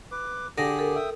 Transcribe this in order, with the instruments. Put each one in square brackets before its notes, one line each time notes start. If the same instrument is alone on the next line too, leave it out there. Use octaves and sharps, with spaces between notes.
[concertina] B4 D6
[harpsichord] D3 [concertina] G4 G#4 [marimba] A#6
[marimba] A4 A#4
[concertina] E5 G5 D#6